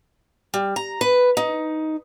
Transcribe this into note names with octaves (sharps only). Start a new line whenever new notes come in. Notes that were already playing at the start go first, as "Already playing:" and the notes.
G3
A#5
B4
D#4